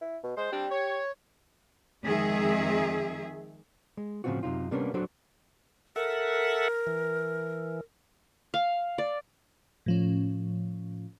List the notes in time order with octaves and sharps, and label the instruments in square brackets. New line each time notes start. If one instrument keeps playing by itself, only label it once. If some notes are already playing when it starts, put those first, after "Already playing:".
[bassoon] E4
B2
[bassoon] G#3 [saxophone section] C5
[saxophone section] G3 C4 D4 [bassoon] G4
[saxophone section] C#5
[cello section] F2 D#3 G#3 G#4 E5
[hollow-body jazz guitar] G#3
A2 C#3 F3 C4 F4 F#4
F#2 C3 D#4 F4
C3 G3 A#3 B3 C#4 D4
F#3 D4 F#4 A4 C5 D5
[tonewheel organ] A4 E5 F#5 [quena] A#4
[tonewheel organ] E3
[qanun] F5
D5
[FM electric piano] A2 F3 C#4